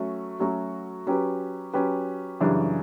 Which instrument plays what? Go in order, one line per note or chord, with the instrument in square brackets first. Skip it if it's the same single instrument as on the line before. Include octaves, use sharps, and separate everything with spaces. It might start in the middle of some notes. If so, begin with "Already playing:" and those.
Already playing: [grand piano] F#3 A3 C#4 F#4
F#3 A3 C#4 F#4
F#3 C#4 G4 B4
F#3 C#4 G4 B4
F#2 C#3 E3 G3 D4